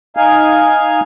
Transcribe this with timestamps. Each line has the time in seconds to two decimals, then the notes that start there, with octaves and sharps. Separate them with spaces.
0.17 D#4 F5 G#5